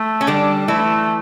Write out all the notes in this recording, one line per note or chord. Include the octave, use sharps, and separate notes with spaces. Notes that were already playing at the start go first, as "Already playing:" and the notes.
Already playing: A3
C#4
D3 G3 D4
E3 A3 E4